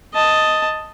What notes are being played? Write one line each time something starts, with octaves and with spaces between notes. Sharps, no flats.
D#5 A5